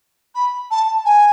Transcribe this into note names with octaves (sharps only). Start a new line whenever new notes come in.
B5
A5
G#5